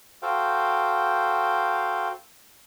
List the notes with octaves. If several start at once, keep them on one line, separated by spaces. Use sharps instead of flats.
F#4 A4 C5 F5 G5